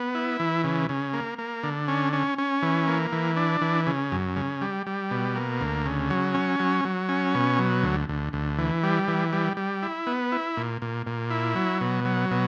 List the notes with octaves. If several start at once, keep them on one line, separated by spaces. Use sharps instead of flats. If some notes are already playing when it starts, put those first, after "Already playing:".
Already playing: B3
E4
E3
C#3
C#3
A#3
A#3
D3
C#4
C#4
C#4
E3
A#3
E3
D4
E3
C#3
F#2
C#3
G3
G3
B2
A#3
D2
C#3
F#3
C#4
F#3
F#3
C#4
B2
F#3
D2
D2
D2
E3
G3
E3
G3
G3
E4
B3
E4
A#2
A#2
A#2
E4
F#3
B2
F#3
B2